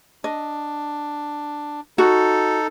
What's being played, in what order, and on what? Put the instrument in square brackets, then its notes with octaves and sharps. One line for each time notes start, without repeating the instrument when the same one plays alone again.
[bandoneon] D4 [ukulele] D#5
[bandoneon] D#4 A4 [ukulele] F#4